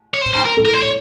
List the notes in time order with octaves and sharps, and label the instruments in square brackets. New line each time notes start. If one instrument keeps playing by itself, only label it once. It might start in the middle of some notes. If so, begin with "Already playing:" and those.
[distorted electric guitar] C#5
C5
C5
A#4
[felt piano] A4
[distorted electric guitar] A#4
C5
C#5